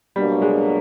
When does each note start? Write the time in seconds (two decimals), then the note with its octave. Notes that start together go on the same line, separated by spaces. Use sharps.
0.15 B2 F#3 G3 A#3 D4 F#4
0.42 G#3